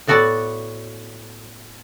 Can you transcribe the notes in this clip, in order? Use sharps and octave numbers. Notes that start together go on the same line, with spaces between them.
A2 B3 F#4 A4 D5 F#5